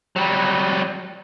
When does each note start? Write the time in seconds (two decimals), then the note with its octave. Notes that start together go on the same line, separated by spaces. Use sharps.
0.16 F#3 G3